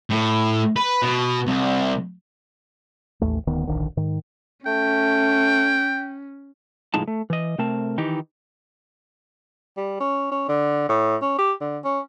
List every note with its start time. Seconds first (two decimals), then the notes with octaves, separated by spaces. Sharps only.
0.10 A2
0.76 B4
1.02 B2
1.47 C2
3.22 A1 D#2 A3
3.47 D1 D2 D#3 B3
3.67 D1 A#1 D3 D#3
3.97 G#2 D#3
4.67 A3 C#4 G5
6.94 C#2 A2 F3 G#3 D#4 A5
7.08 A3
7.30 E3 D#5
7.58 C3 A3 C4 A#4 A5
7.98 D#3 E3 D#4 G4
9.77 G3
10.00 C#4
10.31 C#4
10.49 D3
10.89 A2
11.22 C#4
11.38 G4
11.61 D3
11.84 C#4